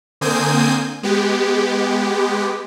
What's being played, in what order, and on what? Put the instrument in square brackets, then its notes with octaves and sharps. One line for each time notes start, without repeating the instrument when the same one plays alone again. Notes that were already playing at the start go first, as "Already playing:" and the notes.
[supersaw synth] D3 A#3 C4 G#5 D#6 G6
G#3 B3 G4